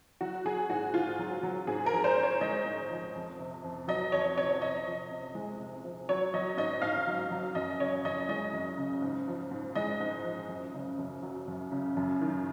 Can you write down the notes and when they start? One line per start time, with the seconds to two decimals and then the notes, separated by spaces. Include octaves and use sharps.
0.21 F#3 F#4
0.45 F#3 G#4
0.70 G#2 F#4
0.94 G#2 F4
1.19 F#3
1.43 F#3
1.67 G#2 G#4
1.86 A#4
1.92 F3
2.04 C5
2.17 G#2
2.23 C#5
2.41 G#3 D#5
2.65 G#2
2.91 F3
3.15 F2
3.39 C3
3.64 F2
3.88 F#3 D#5
4.12 F2 C#5
4.37 C3 C#5
4.61 C3 D#5
4.86 F3
5.11 C3
5.35 G#3
5.60 C3
5.84 F3
6.09 F#3 C#5
6.34 F#3 D#5
6.57 G#2 D#5
6.82 G#2 F5
7.07 F#3
7.31 F#3
7.55 F#2 D#5
7.80 C#3 C#5
8.05 F#2 D#5
8.29 G#3 D#5
8.53 F#2
8.78 C#3
9.02 G#2
9.28 F3
9.51 G#2
9.75 G#3 D#5
10.00 G#2
10.24 F3
10.49 F#2
10.74 C#3
10.99 F#2
11.23 F#3
11.48 F#2
11.72 C#3
11.97 F#2
12.21 D#3